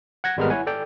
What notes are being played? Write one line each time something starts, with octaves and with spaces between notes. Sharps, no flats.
F#5 G#6 A#6
G#1 G3 G#3 B3 A#4 F6
E4 C#5 F#5 G#5
A4 D5 G5